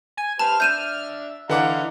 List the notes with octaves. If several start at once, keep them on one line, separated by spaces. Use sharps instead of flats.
G#5
G4 B4 C5 A5 F6
D4 E5 G6 D#7 E7
D3 E3 D#5 F5 F#5 A#5 D6